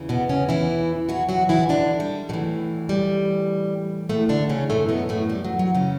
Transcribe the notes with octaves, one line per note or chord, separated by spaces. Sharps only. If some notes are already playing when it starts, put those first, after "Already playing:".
Already playing: E2 C#3 E3
B2 B3
C#3 C#4
E3 E4
F#3 F#4
F#3 F#4
E3 E4
D3 D4
G3
A2 E3 F#3
G3
A2 A3
D3 D4
C#3 C#4
F#2 A2 E3 A3
B2 B3
A2 A3
G3
F#3
F#3
C#3 C#4